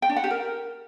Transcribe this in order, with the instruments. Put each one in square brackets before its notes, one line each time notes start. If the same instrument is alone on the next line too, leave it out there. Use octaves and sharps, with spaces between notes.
[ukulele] G5
D4
F#5
G4
A#4